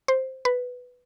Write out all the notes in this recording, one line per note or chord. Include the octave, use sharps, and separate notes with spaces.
C5
B4